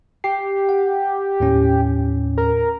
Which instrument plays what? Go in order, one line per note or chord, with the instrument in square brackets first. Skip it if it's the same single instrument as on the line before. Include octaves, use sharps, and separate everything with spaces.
[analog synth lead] G4 [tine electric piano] C7
[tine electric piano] F#5
D#2 A2 C#4
[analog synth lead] A#4